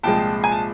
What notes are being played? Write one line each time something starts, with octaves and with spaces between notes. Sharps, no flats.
C2 A#2 F3 G#3 G5 A5
G#5
A5